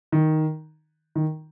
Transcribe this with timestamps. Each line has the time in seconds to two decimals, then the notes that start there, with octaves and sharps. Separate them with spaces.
0.12 D#3
1.15 D#3